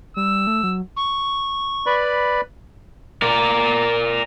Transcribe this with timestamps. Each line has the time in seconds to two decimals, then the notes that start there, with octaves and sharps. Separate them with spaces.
0.17 G3 E6
0.47 A3
0.63 F#3
0.97 C#6
1.86 B4 D5 B5
3.22 A#4 D5